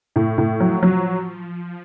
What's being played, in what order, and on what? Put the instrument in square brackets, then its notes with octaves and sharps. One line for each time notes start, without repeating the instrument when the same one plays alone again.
[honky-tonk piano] A2
A2
[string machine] F3 [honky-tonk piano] F#3
[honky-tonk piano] F#3